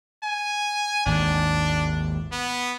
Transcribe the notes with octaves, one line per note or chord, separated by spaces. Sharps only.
G#5
G#1 D#2 G#2 D4
B3